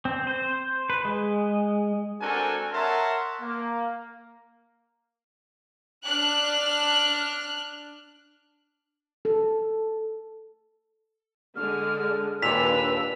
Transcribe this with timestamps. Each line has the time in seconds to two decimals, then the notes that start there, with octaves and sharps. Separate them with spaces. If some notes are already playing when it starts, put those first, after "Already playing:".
0.05 C4
0.27 C5
0.90 B4
1.05 G#3
2.21 C4 D4 F#4 A4 A#4 G#5
2.72 A#4 C#5 E5 F#5 A5 C6
3.41 A#3
6.05 D4 F6 F#6
9.25 A4
11.56 D3 G#3 F6
12.42 D#2 A#2 D4 B4 E6 B6 F7